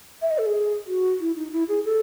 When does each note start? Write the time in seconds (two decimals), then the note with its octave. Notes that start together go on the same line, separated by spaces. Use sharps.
0.22 E5
0.31 D#5
0.38 A4
0.46 G#4
0.87 F#4
1.20 E4
1.36 D#4
1.52 E4
1.69 G#4
1.85 A4